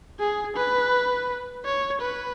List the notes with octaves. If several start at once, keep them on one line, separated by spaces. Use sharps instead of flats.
G#4
B4
C#5
B4